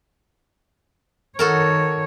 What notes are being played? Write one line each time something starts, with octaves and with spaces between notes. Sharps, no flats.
D#3 F#4 A4 A#4 C#5